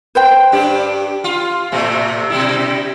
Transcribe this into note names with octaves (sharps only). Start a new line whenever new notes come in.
B4 C5 G5
G2 D4 G4
F4
A2 C3 A3
B2 G3 E4